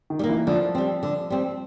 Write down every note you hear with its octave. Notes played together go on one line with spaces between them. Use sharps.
D#3
G3
A#3
E3
D3 F3
G3 C4
D3
G3 C4